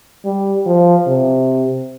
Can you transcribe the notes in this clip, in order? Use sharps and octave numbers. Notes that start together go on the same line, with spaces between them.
G3
F3
C3